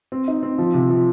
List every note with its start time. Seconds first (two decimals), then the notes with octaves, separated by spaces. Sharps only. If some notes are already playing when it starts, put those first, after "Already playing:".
0.12 C4
0.28 D#4
0.43 C4
0.58 F3
0.74 C3
0.90 F3